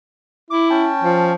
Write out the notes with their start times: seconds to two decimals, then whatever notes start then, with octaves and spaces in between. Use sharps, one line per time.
0.50 E4 D6
0.70 C#4 G5 A5
1.03 F3